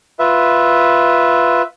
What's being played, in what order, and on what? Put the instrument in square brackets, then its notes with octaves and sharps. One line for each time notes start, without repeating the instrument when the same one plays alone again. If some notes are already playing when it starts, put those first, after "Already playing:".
[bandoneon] F4 B4 E5